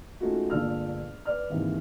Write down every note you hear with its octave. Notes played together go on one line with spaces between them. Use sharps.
G#3 A3 C#4 D#4 F4 F#4
G1 A#2 G#3 D4 E6 F6
B4 D5 F6
D#2 G#2 C3 D#3 E3